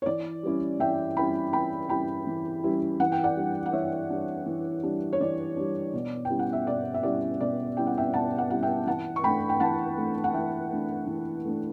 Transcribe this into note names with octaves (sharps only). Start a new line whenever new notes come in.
C#5
E3 D5
G3 C#4 E4
E3 E5 G5
G3 C#4 E4 G5 B5
E3 G5 B5
G3 C#4 E4 G5 B5
E3
G3 C#4 E4
E3 F#5
G5
D5 F#5
G3 D4
F#5
E3 C#5 E5
G3 D4
E3
G3 D4
C#5
E3 D5
G3 D4
B2
G5
G3 C#4 E4
F#5
E5
B2 D5
E5
G3 C#4 E4 D5
B2 D5
G3 C#4 E4 G5
F#5
E5 G5
B2 F#5 A5
D5 F#5
G3 C#4 E4 F#5
E5 G5
E3 F#5 A5
C#6
A3 D4 G5 B5
G5
E3 F#5 A5
A3 D4
F#5
E3 E5 G5
A3 D4
E3
A3 D4